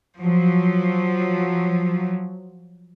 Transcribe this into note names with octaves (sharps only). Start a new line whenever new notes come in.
F3 F#3